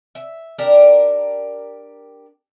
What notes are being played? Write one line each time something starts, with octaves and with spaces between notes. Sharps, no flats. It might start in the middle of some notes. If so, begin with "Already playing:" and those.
E5
D4 G4 A#4